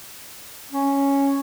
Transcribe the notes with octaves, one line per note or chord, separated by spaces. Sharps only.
C#4